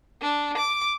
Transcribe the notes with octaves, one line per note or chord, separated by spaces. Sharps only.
D4
D6